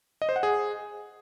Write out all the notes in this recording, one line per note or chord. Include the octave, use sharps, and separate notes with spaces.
D#5
C5
F#5
G#4